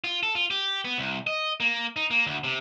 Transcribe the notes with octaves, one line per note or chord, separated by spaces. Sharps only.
F4
A4
F4
G4
B3
C2
D#5
A#3
D#4
A#3
D2
C3